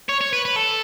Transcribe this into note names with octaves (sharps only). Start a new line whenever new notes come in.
C#5
C#5
B4
B4
A4